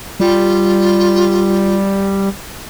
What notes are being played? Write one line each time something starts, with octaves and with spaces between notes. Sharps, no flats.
G3 F4